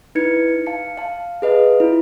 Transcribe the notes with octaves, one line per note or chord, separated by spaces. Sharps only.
D#4 E4 B4 G#6 C#7
F5 A5 C#7
F5 A5
G#4 B4 D#5 F5 A5
E4 F4